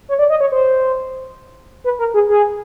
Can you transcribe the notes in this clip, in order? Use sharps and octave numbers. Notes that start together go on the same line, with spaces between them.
C#5
D5
D#5
C#5
C5
B4
A#4
G#4
G#4